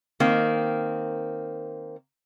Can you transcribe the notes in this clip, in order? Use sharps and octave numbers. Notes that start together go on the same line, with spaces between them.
D#3 A#3 C4